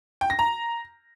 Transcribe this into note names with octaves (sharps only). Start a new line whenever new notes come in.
G5
A#6
A#5